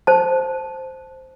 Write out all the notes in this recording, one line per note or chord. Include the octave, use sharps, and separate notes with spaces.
C5 A5